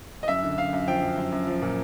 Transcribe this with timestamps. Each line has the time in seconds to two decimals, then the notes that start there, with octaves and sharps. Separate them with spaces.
0.23 D#5
0.28 F#2 E5
0.43 D3
0.58 F#2 F5
0.73 F#2
0.87 F3 G5
1.02 F#2
1.17 F#2
1.32 F#2
1.47 F3
1.62 A#2